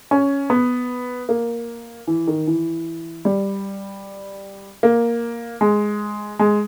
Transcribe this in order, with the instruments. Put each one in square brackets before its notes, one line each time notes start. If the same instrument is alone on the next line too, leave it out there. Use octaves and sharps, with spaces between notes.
[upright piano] C#4
B3
A#3
E3
D#3
E3
G3
A#3
G#3
G#3